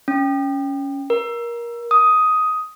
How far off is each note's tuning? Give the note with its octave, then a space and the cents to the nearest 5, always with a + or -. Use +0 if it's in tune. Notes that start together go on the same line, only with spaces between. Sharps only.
C#4 +10
A#4 +20
D#6 +10